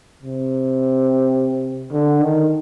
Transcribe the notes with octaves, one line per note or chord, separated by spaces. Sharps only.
C3
D3
D#3